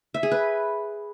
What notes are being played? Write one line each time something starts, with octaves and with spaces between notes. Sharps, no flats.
E5
G#4
B4